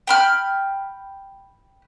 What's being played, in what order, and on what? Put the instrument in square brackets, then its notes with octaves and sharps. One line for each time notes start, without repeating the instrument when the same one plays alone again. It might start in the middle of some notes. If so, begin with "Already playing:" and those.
[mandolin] G5 B5 F6